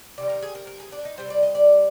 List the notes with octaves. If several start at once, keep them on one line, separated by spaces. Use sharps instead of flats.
C3 D#3 G3 D5
A#4
G#4
A#4
A#4
G#4
D4
D#4
C3 G3 C5
D5
D#5
D5